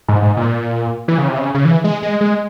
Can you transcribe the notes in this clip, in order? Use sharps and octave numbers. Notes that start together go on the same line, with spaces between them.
G#2
G#2
A#2
E3
C#3
C3
C#3
C#3
E3
G#3
G#3
G#3